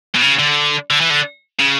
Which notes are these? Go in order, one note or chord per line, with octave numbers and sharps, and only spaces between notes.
B2
C#3
D3
D3
E3
D3
C#3